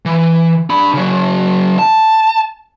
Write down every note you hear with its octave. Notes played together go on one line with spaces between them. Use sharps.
E3
D4 B5
C#3 F#3
A5